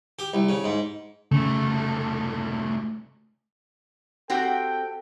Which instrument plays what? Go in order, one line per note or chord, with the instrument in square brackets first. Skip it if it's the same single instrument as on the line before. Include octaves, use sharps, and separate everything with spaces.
[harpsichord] G4
C2
C#3
G#2
[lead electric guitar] C2 A3 [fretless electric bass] C#3
[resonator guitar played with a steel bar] C4 F#4 G4 [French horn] A4 [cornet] G5